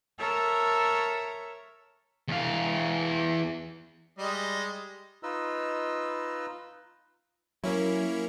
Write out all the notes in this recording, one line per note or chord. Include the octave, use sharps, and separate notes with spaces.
A4 A#4 C#5 E5
E2 F5
G3 G#3 D#5
D#4 F4 B4 D#5 E6
F#3 A#3 C#4 E4